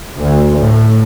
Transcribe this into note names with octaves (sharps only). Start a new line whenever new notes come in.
D2
A2